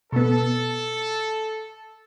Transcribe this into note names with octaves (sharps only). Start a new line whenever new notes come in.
B2 B3 A4